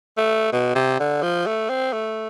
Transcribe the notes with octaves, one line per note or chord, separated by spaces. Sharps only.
A3
B2
C3
D3
F3
A3
C4
A3